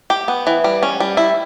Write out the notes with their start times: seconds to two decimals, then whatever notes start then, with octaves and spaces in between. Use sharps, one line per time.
0.10 G4
0.28 B3
0.47 E3
0.64 G3
0.83 C#4
1.00 G3
1.17 E4